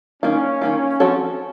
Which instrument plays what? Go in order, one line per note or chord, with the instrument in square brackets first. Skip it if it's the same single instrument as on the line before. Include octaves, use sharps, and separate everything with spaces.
[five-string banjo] D#3 A#3 F4 [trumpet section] C#4
[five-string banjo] D#3 A#3 F4
F3 C4 F#4 A4 C#5